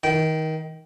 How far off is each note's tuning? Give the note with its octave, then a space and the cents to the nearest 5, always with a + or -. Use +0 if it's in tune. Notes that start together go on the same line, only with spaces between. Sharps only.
D#3 +25 G5 -15